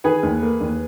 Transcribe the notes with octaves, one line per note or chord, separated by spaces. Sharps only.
D#3 G#4 B4
D#2
A#3
D#2